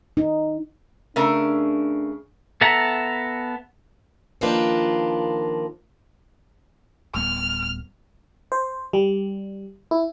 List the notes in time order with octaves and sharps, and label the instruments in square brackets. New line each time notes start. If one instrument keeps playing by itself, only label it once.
[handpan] D#4
[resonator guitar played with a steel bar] C#3 A3 A#4 [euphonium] D4
[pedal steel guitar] B3 A4 E5 F#5 A#5
[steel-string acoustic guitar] D#3 F3 A#3 D4 F4 B4
[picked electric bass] D1 G3 B3 [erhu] F6
[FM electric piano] C5
G3
E4